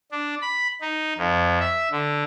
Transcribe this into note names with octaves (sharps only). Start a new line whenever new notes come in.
D4
B5
D#4
F2
E5
D3